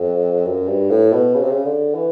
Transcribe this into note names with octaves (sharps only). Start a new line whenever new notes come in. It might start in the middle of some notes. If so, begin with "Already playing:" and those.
Already playing: F2
F#2
G2
A2
B2
C#3
C3
C#3
D3
E3